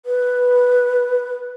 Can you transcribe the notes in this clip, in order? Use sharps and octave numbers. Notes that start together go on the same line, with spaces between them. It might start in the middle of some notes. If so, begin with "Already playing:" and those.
B4